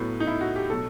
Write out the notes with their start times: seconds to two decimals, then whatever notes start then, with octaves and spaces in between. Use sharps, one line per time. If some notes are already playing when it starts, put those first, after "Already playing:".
Already playing: A2 F#3 B3
0.20 D#4
0.27 E4
0.41 F#4
0.56 G4
0.70 B2 F#3 A3 A4